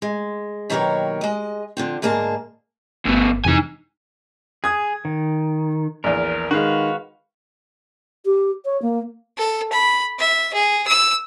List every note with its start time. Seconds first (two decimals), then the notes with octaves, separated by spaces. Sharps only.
0.02 G#3
0.70 B2 D#3 F#3 A#3 G4 C#5
1.21 G#3 D#5
1.77 D3 F3 C4
2.02 D2 G#2 A#3 G#4 A5
3.06 G1 D2 B2
3.45 F2 C3 E3 D#4 G#5
4.64 G#4 D#6 G#6
5.05 D#3
6.04 A#1 E2 A#4
6.51 D#3 G#3 F#4 B4 F5
8.25 G4
8.65 C#5
8.82 A#3
9.38 A4
9.73 B5
10.19 E5
10.54 G#4
10.87 E6